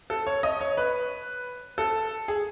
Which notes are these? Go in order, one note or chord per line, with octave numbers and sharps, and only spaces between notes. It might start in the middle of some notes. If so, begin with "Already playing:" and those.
A4
C#5
D#5
C#5
B4
A4
G#4